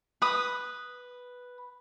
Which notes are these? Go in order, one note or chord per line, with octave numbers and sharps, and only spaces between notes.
B4 D#6